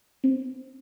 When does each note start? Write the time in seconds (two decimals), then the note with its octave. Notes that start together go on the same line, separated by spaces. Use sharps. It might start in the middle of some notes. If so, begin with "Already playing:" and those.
0.24 C4